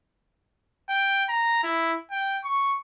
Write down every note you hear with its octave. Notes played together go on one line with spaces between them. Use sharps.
G5
A#5
E4
G5
C#6